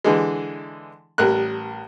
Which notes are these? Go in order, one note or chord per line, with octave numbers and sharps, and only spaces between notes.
D3 E3 G#3
A1 G3 A#4 F#6